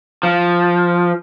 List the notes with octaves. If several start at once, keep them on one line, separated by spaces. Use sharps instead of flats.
F3